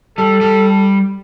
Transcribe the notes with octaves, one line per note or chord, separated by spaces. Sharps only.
G3 A4
G3